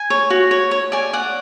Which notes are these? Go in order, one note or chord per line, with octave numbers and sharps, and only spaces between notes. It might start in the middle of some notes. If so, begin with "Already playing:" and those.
Already playing: G#5
C#5
F#4
C#5
C#5
D5 G#5
D5 F#5